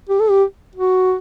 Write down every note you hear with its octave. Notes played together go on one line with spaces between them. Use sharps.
G4
A4
G4
F#4